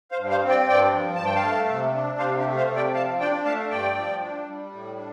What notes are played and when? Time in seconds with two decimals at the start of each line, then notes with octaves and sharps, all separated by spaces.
0.11 C5 F5
0.18 G2
0.30 C5 F5
0.43 C4
0.49 D5 G5
0.68 G2 D5 G5
0.93 F3
1.15 G2 A5
1.25 G5
1.35 F5 A5
1.44 A3
1.69 C3
1.94 D4
2.19 C3 C5 F5
2.39 G4
2.45 A3
2.57 C5 F5
2.70 C3
2.76 D5 G5
2.95 F3 F5 A5
3.20 D4 D5 G5
3.45 A3 F5 A5
3.71 G2 D5 G5
3.96 F3
4.21 D4
4.47 G3
4.72 A2
4.96 D4